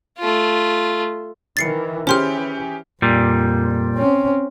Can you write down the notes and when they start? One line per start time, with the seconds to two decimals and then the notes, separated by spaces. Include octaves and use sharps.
0.18 A3 F4
1.57 D#3 E3 A6 C7 C#7
2.07 E3 C#4 G4 G#4 C5 C6 F6
3.02 F2 A#2 G3
3.97 C4 C#4